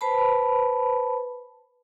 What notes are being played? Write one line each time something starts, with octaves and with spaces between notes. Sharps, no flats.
B4 C5 A5 B5